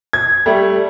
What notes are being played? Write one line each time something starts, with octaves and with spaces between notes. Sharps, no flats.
G#6
G3 A3